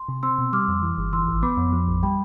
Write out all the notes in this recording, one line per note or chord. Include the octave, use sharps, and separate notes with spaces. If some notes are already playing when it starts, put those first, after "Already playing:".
Already playing: C6
C3
C4 C6 E6
B2
G3 D6 F6
F2
E3
G1
E3 C6 E6
A1
B3 B5 D6
F2
F3
A1
G3 G5 B5